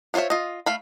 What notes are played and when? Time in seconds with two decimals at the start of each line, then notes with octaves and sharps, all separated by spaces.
0.14 B3 F4 C5 C#5 E5
0.30 F4 D#5
0.66 A3 F5 B5